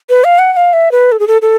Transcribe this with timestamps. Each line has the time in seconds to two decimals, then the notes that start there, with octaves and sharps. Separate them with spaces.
0.10 B4
0.24 F5
0.39 F#5
0.53 F#5
0.57 F5
0.73 E5
0.92 B4
1.12 A4
1.20 G#4
1.28 A4
1.42 A4